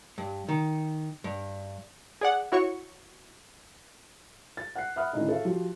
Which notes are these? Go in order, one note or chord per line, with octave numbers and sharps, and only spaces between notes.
G2
D#3
G2
G#4 D5 F#5
E4 F#4 C#5 C#6
A6
F#5 F#6 C7
E5 F#5 B5 D#6 F6 F#6
A2 D3 D#3 C#4 D#4 E4
A4 C#5 E5 F5
F3 F#4 G4